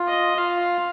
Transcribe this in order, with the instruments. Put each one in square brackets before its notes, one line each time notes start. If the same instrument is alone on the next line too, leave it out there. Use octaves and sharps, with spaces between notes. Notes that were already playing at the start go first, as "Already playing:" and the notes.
Already playing: [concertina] F4
[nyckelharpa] D#5
[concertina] F4 [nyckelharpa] F5